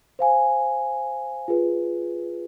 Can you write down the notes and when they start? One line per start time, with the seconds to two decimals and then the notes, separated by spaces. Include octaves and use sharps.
0.19 C5 F5 G#5
1.48 F4 G#4 B4